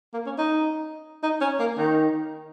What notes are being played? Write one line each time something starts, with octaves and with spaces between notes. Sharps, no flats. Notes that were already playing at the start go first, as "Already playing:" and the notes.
A#3
C#4
D#4
D#4
C#4
A#3
D#3